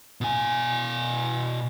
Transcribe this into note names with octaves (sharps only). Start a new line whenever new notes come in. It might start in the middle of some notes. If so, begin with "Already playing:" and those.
B2 G#5